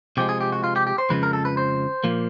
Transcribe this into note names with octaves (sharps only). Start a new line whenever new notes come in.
C3 F3 G#3 G4
G#4
G4
F#4
F4
G4
G4
C5
F2 C#3 F3 G#3 B4
A#4
A4
B4
C5
A#2 F3 A#3